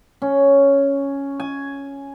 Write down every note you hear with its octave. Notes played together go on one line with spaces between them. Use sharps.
C#4
G#5